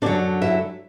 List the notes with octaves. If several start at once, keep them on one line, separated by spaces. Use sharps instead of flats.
F#2 D3 F#3 D4 D5
E4 E5